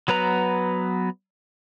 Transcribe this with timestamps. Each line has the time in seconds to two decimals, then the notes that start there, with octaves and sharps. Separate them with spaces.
0.08 F#3 B3 B4 A#5